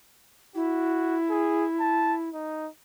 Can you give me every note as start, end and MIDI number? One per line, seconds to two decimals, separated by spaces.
0.55 2.29 64
0.55 1.17 66
1.30 1.64 68
1.80 2.14 81
2.33 2.68 63